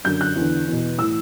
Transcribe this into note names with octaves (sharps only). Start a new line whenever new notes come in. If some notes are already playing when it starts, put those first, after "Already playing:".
F#2 D3 G6
F#6
E2
D3
E2 B2
A2 E3 E6